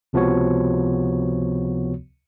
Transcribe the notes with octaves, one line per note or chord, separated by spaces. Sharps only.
C#2 C3 F3 B3 F#4 C#5